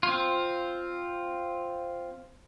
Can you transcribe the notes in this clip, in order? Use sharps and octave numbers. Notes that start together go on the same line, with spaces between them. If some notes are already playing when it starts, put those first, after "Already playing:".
C4 F4